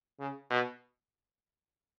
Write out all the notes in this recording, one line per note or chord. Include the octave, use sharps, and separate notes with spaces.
C#3
B2